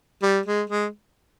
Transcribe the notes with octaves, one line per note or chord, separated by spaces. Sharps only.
G3
G#3
G#3